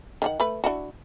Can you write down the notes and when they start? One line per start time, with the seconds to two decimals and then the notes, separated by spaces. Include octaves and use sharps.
0.22 D#3 D4 F#5
0.40 A3 B4
0.64 D4 E4 F#4